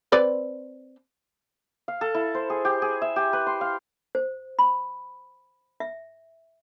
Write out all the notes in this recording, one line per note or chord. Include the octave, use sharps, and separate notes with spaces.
C4 B4 D5
F5
A4
E4
C5
G#4
G4
G#4
E5
G4
B4
C6
F5
C5
B5
E5